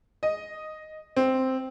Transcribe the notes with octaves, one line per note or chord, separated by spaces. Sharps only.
D#5
C4